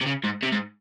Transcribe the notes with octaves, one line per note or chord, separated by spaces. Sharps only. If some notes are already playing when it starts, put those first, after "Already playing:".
C3
C#3
G#2
C3
G#2